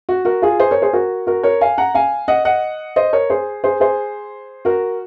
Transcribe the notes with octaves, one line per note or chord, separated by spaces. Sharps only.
F#4
F#4 A#4
F4 G#4
G#4 C5
A#4 C#5
G#4 C5
F#4 A#4
F#4 A#4
A#4 C#5
F5 G#5
F#5 A#5
F5 G#5
D#5 F#5
D#5 F#5
C5 D#5
A#4 C#5
G#4 C5
G#4 C5
G#4 C5
F#4 A#4